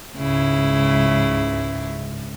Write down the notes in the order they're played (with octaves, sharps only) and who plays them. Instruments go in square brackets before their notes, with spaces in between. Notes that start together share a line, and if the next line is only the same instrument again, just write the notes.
[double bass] C#2 G#2 [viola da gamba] C#3 E4